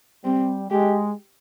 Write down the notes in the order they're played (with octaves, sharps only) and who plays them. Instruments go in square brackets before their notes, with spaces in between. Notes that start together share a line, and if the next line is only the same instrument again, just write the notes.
[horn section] G3 [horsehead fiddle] C4
[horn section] G#3 [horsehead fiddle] G4